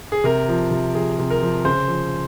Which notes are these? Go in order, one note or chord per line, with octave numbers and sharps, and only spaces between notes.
G#4
C3 A#4
F3
C3
F3 G#4
C3
A#4
F3
C#3 C5
F3